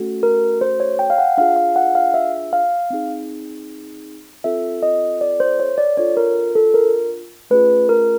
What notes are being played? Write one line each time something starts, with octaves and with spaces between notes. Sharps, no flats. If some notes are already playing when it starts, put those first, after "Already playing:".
Already playing: A3 C#4 F#4 A4
A#4
C5
C#5
G5
F5
F#5
D4 F4 G#4 F5
F5
F#5
F5
E5
F5
C4 D#4 G#4
C4 F4 A4 E5
D#5
D5
C5
C#5
D5
D4 F4 A4 C#5
A#4
A4
A#4
A3 C#4 F4 G#4 B4
A#4